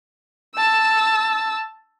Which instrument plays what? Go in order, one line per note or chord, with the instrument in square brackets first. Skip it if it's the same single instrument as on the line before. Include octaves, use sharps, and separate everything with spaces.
[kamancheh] A5 E6